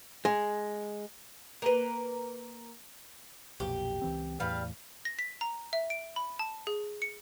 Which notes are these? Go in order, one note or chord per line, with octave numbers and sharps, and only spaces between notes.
G#3
A#3 B4
B1 F2 A#2 G4
C#2 E3 C4
E2 A2 E3 G3 B4 F5
A#6
B6
A#5
E5
D7
B5
A5
G#4
C#7